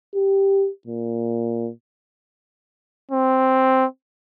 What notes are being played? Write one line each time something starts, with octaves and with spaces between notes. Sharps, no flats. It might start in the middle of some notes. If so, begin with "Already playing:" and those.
G4
A#2
C4